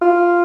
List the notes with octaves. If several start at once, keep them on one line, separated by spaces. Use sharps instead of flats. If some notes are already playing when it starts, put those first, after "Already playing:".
F4